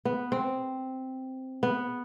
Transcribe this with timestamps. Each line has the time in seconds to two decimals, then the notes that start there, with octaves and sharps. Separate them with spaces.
0.05 B3
0.32 C4
1.63 B3